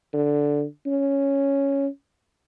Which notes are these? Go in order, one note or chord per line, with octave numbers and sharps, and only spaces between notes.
D3
C#4